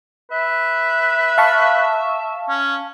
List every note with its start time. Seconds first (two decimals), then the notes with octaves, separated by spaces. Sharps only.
0.31 B4 E5
1.38 F5 A5 C#6
2.49 C#4